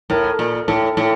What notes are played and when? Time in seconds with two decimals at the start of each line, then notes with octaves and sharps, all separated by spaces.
0.10 A2 A#4
0.39 A#2
0.68 A2 A4
0.97 A2